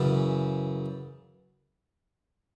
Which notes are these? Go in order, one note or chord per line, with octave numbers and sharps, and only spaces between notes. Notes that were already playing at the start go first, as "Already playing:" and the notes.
Already playing: F#2 C#3 E3